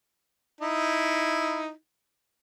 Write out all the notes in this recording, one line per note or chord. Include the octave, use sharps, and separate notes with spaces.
D#4 E4